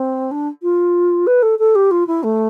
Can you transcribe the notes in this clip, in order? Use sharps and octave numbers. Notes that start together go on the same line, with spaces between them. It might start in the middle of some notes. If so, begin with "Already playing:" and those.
Already playing: C4
D4
F4
B4
A4
A4
G4
F4
E4
A3